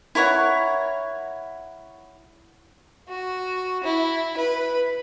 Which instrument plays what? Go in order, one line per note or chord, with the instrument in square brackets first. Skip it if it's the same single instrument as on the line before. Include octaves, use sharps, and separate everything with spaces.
[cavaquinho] E4 A#4 C#5 F#5
[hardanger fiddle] F#4
E4
B4